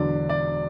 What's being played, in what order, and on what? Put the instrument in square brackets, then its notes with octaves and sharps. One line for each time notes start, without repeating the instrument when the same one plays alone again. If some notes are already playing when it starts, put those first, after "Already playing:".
Already playing: [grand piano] E1 E2 D3 F#3 D5
D5